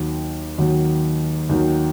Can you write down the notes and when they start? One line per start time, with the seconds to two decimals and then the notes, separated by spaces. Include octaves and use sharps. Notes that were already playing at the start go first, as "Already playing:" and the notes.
Already playing: D#2 D#3 F#3
0.58 D#2 D#3 F#3
1.49 D#2 D#3 F#3